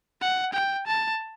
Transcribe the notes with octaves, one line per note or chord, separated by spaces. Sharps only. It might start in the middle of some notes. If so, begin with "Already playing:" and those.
F#5
G5
A5